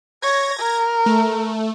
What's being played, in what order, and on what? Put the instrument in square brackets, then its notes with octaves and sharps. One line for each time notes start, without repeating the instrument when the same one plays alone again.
[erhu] C#5 [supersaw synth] G#6 A#6
[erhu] A#4
[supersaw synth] A3